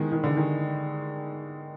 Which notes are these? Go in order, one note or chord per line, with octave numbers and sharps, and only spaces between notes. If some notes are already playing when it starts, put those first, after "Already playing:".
Already playing: D#3 G#3 B3
D#3
D3
D#3